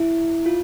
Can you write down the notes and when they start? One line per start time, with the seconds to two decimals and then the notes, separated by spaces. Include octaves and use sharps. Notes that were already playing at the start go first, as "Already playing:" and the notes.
Already playing: E4
0.46 F4